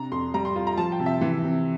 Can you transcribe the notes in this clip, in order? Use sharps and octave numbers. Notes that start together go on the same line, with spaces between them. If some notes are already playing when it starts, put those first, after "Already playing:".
Already playing: C3 D4 A#5
F2 C6
G3 A#5
C6
F4
A#5
F3 A5
G5
C3
E5
E3
C3